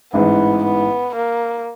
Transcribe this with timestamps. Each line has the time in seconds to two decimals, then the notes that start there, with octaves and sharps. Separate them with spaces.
0.13 A1 G#2 E3 B3
0.64 B3
1.16 A#3